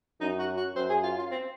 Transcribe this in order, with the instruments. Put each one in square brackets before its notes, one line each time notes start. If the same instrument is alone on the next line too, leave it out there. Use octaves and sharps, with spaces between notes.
[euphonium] F#2 [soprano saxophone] D#4
[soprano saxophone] F#4
F#4
[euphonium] F#2 [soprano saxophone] C5
[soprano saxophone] G#4
F4
F4
C4